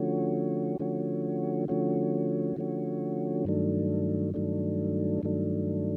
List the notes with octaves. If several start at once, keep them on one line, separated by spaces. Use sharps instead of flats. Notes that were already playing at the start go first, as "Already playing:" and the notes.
Already playing: D3 F3 A3 C#4 F#4
D3 F3 A3 C#4 F#4
D3 F3 A3 C#4 F#4
D3 F3 A3 C#4 F#4
G2 D#3 F#3 A3 D4
G2 D#3 F#3 A3 D4
G2 D#3 F#3 A3 D4